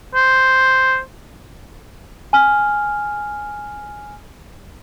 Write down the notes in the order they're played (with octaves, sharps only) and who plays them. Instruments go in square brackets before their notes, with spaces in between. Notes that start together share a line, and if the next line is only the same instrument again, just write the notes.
[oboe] C5
[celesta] G#5 F6